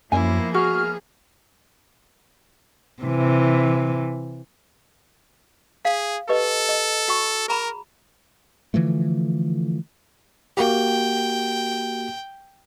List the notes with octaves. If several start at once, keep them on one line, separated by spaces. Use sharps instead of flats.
F#2 F3 A#3 B3 E4 G#5
F#4 G#4 F6
C3 E3
G#4 F5
G4 A4 B4 D#5
D#5
F#4 G5 C#6
G#4 A#4 A#5 B5
D3 E3 F3 A3
A#3 F#4 G4 G5